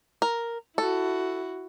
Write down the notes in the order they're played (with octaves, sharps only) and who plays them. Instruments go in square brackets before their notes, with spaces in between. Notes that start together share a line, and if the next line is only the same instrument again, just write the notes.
[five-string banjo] A#4
[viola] E4 F#4 [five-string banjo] A4